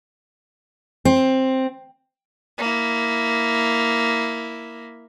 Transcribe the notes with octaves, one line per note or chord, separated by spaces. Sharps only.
C4
A#3 E4